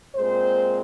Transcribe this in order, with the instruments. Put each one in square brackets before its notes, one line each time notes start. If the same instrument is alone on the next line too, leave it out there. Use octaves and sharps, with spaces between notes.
[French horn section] A#2 G#3 C4 C5